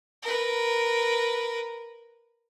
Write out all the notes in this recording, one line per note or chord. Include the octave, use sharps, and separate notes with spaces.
A#4 B4